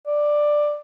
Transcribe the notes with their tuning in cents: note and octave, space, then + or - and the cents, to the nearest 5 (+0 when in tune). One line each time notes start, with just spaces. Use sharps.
D5 +10